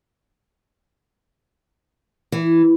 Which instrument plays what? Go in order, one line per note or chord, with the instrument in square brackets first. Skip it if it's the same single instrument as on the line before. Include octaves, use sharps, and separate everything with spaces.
[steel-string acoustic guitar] E3